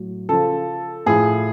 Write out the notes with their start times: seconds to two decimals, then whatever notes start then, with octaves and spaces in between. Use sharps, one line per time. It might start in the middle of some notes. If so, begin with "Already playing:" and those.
Already playing: A2 F#3
0.29 C#3 F3 A4
1.06 A2 F3 G#4